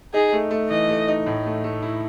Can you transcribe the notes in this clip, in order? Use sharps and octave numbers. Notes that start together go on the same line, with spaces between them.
D#4 G#4
A3
A3
E3 D#5
A3
D#4
A2
A3
A3
E4